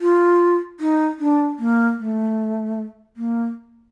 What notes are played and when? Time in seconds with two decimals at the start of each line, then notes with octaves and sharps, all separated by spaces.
0.01 F4
0.80 D#4
1.19 D4
1.59 A#3
1.99 A3
3.17 A#3